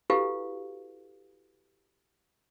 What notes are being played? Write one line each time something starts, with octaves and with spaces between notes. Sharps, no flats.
E4 F#4 G4 A4 B4 F5